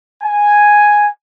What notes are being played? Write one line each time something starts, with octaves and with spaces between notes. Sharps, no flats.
G#5